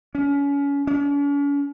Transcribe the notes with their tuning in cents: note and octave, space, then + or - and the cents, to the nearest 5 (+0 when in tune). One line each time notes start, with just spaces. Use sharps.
C#4 +30
C#4 +45